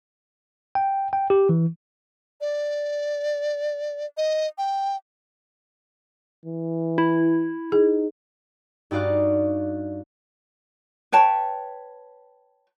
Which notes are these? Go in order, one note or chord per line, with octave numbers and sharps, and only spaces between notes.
G5
G5
G4
E3
D5
D#5
G5
E3
E4
D#4 G#4
G2 D#4 F#4 D5 F5 F#6
B4 C#5 G5 A5